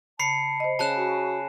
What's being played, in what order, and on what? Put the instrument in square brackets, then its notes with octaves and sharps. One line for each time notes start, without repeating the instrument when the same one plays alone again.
[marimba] C#3 [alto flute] A5 [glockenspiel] B5 C7 C#7
[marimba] C5 D#5
[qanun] C#3 F5 [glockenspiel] A5 F#6 E7
[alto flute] F#4